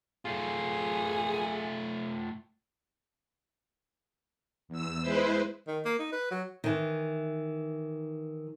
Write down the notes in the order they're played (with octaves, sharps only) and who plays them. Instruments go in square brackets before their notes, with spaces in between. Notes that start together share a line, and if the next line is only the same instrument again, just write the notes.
[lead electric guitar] A3 F4 [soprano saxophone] G#4
[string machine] E2 E6
G#3 E4 B4 C5
[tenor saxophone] D#3
A#3
D#4
B4
F#3
[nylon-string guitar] D#3 E3